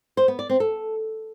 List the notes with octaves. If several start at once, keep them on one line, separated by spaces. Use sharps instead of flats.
C5
B3
D5
C4
A4